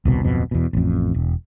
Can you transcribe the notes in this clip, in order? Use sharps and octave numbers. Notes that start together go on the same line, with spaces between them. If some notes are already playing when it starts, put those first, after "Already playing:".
D#1 C2 B2
D1 F2 B2
E2 B2
A1 F2
E1